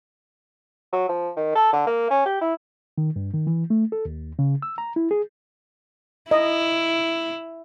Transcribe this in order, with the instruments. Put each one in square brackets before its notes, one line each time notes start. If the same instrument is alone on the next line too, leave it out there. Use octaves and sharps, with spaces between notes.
[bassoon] F#3
F3
D#3
A4
D3
A#3
C#4
G4
E4
[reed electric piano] D#3
G2
D#3
E3
A3
A4
D#2
C#3
E6
A#5
E4
G#4
[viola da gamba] E4 [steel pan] D#5